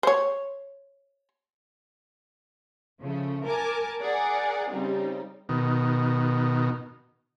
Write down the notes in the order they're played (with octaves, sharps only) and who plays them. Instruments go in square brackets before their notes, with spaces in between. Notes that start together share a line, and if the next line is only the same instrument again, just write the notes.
[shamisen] C5 C#5
[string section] C#3 F3 A3
A#4 G#5 A5 D6
G#4 A#4 D5 F#5
C#3 G3 C4 D#4
[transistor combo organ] B2 D#3